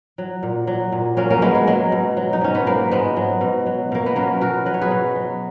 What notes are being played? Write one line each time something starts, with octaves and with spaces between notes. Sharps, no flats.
F#3
A#2
F#3
A#2
F#3 A#3 C#4
A#3 C#4
B2 G#3 B3
A#3
F#3 G#3
B2
F#3
D#4
G#2 C#4
B3
F#3 A#3
G#2 G#3 B3
F#3
B2
F#3
B2 A#3
B3
F#3 A#3 C#4
B2 F#4 A#4
F#3 B4
C#5
G#4 B4
B2
F#3